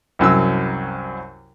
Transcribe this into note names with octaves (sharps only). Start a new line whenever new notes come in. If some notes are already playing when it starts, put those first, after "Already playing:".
C2 F#2 F#3 E6